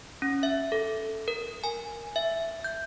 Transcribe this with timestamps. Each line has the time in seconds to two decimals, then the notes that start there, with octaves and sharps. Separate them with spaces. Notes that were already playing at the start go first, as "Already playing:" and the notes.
0.22 C#4
0.43 E5
0.72 A4
1.28 A#4
1.64 G#5
2.16 E5
2.64 G6